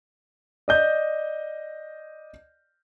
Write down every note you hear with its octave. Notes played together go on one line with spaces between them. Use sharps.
D5 D#5 G6